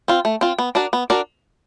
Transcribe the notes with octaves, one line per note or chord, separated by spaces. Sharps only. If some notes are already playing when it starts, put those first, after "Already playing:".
C4 F4
A3
C4 F4
B3
D4 F#4 A#4 D5
B3
D4 F#4 A#4 D5